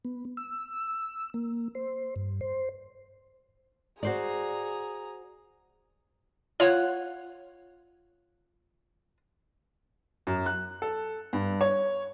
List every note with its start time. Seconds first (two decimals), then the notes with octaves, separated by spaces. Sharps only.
0.05 B3
0.37 E6
1.34 A#3
1.75 C5
2.16 G2
2.41 C5
4.03 F#4 G#4 C5 D5 A#5
6.60 F4 C#5 F#5
10.27 F#2
10.46 F#6
10.82 A4
11.33 G2
11.61 C#5